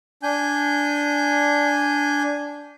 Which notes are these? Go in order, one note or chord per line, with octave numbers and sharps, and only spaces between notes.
D4 G#5 G6